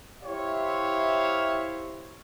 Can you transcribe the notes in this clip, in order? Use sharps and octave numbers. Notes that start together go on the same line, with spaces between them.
E4 G4 C5 C#5 E5 F5